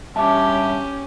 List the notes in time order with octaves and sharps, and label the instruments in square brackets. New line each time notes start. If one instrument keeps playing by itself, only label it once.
[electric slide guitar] G2 E5 [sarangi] C#4 [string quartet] G4 [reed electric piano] A5 D6